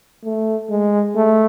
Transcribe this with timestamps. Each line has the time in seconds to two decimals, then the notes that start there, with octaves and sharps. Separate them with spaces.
0.24 A3
0.70 G#3
1.16 A3